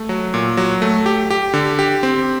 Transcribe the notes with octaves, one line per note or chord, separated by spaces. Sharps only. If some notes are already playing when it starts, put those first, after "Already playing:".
Already playing: A3
F#3
A#2
F#3
A3
G4
G4
D3
G4
C4